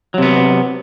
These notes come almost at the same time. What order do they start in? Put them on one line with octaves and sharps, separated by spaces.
F#3 C3 B3